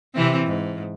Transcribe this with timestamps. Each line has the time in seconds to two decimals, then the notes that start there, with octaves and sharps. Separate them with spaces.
0.14 C3 E3 C4
0.46 G#2